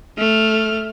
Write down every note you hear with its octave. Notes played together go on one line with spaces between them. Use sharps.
A3 F6